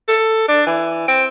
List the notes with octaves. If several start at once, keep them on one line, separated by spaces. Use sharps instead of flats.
A4
D4
E3
C4